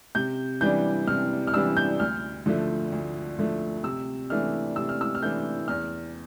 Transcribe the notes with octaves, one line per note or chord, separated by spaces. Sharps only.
C3 G6
E3 G3 D4 G6
C3 F6
F6
E3 G3 D4 E6
G6
D2 F6
D3 F3 A3
D2
D3 F3 A3
C3 E6
E3 A3 D4 F6
C3 E6
F6
E6
F6
E3 A3 D4 G6
E2 F6